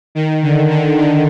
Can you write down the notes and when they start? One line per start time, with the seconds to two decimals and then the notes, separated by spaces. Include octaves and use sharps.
0.15 D#3
0.43 D3
0.71 D3
0.99 D#3